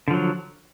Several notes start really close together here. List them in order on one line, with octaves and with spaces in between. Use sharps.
D3 F3 F#3